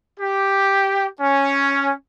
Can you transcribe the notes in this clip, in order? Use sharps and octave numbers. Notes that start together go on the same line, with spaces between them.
G4
C#4